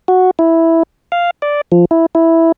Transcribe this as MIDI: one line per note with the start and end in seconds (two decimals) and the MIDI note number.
0.08 0.31 66
0.39 0.83 64
1.12 1.31 77
1.42 1.61 74
1.72 1.85 53
1.91 2.06 64
2.15 2.52 64